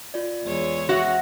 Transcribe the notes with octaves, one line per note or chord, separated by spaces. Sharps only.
F4 D5
E2 G#3 C#5
F#4 E5 A#6